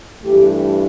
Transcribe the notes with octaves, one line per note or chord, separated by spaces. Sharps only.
G2 E3 A3 G4